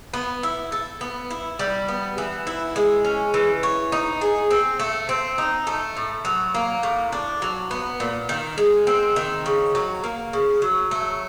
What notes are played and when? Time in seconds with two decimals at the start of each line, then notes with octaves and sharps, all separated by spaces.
0.14 B3
0.43 E4
0.72 A4
1.01 B3
1.30 E4
1.59 G3
1.88 B3
2.18 E3
2.47 E4
2.76 G#3
3.05 C#4
3.34 E3
3.63 C#5
3.92 D#4
4.21 G#4
4.51 C4
4.80 A3
5.09 C4
5.38 D#4
5.67 A3
5.97 A2
6.25 F#3
6.54 A#3
6.83 A2
7.12 D4
7.42 F#3
7.71 B3
8.00 A#2
8.29 D#3
8.58 G#3
8.87 C4
9.16 D#3
9.46 C#3
9.75 F#3
10.04 A#3
10.33 C#3
10.62 F#3
10.91 A3